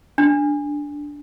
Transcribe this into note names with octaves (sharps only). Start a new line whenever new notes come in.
D4